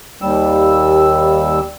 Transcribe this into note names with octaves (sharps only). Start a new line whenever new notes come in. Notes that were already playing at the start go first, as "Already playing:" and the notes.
D#2 G3 E6